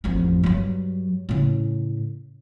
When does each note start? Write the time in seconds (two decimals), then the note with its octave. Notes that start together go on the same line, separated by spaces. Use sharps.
0.04 A1 F2
0.44 G2 F#3
1.29 A2 C#3